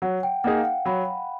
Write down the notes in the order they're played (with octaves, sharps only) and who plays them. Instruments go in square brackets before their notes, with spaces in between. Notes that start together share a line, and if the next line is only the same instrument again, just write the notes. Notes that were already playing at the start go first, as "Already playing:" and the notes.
[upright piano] F#3 [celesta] F#5
[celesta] G5
[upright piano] A#3 D#4 G#4 [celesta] F#5
[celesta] F5
F#5
[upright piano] F#3 [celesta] B5